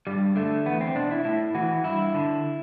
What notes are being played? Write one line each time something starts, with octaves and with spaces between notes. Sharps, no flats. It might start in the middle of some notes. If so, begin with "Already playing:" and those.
G2 G3
D3 A3
E2 B3
C4
B2 D4
E4
A2 E4
E3 F#4
G2 E4
D3